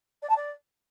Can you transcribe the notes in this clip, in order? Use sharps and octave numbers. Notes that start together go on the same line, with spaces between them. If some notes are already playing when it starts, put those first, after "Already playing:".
D5
A5
D5